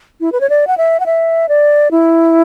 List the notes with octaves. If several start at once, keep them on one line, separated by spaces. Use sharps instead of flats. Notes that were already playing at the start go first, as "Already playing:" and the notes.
E4
B4
C#5
D5
F#5
E5
F#5
E5
D5
E4